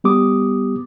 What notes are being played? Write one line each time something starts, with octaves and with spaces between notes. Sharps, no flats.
G3 B3 G4 D6 D#6